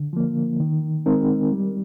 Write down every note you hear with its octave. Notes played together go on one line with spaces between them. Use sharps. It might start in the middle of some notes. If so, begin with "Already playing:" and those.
Already playing: D3
F3 A#3
D#3
G#3 C4 D#4 A#4
G3